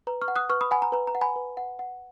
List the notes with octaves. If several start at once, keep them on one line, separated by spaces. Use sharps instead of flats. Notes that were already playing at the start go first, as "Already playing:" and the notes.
B4 A#5
C#6 F6
F#5
D#6 F#6
B4 C#6 F6
B5 D#6
F#5 G#5 B5
A#5
B4 A#5
A#5
F#5
G#5 B5
B4
F#5
F#5